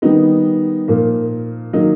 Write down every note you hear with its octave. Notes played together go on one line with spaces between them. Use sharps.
D#3 G3 B3 D#4
A#2 F3 A#3
D#3 F#3 A#3 D#4